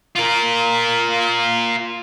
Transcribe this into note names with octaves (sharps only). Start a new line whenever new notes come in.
F4 A#4